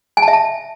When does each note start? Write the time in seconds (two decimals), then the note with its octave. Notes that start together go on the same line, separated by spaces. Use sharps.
0.17 G#5
0.22 A5
0.28 E5
0.33 A5